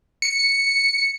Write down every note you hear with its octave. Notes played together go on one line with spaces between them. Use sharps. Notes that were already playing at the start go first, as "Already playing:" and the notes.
C#7